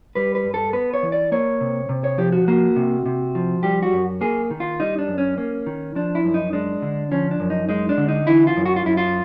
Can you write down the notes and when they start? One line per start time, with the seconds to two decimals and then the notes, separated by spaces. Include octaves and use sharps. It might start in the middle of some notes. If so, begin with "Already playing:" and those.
0.15 G3 B4
0.35 B4
0.44 G2
0.54 A4
0.73 B3 B4
0.94 C#5
1.03 E3
1.12 D5
1.32 A#3 C#5
1.61 C3
1.89 C3
2.04 C#5
2.18 F3 G4
2.32 F#4
2.48 A#3 F#4
2.76 C3
3.06 C3
3.35 F3
3.63 G3 G4
3.83 F#4
3.93 F#2
4.21 A#3 G#4
4.51 D#3
4.60 F4
4.80 G3 D#4
4.99 D4
5.08 F#2
5.18 C#4
5.38 A#3 C#4
5.66 D#3
5.96 F3 D4
6.15 E4
6.25 F#2
6.34 D#4
6.53 G#3 D4
6.82 D3
7.11 F3 C#4
7.31 D4
7.40 F#2
7.50 D#4
7.69 G#3 D#4
7.89 D4
7.98 D3
8.08 D#4
8.27 E3 E4
8.47 F4
8.57 F#2
8.66 F#4
8.76 F4
8.85 F#2 E4
8.97 F4